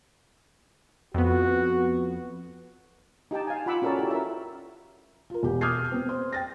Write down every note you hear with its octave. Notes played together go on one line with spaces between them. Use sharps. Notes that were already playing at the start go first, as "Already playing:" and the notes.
F2 B3 F#4
D#4 G4 G5 A5
F5 G#5
F4 F#5 B5 D6 E6
C#4 F#4 A4 A#4 D5 A5
E4 G4
A#4 E5
F4 A#4
E1 G4
D6 D#6 F6 G6 G#6 C7
B3 C4
C5
G5 A6 A#6